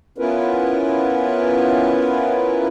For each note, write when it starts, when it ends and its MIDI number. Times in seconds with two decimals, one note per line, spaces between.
0.18 2.68 59
0.18 2.68 61
0.18 2.68 64
0.18 2.68 65
0.18 2.68 70
0.18 2.68 71